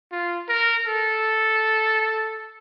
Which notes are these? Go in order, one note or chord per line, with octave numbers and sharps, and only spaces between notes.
F4
A#4
A4